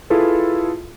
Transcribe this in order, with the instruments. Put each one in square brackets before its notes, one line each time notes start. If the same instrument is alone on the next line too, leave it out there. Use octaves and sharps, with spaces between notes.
[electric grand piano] E4 F4 G#4 A4 B4